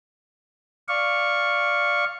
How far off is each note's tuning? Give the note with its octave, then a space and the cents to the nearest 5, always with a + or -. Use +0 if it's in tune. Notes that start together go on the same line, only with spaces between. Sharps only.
D5 +0 F5 +0 C#6 -5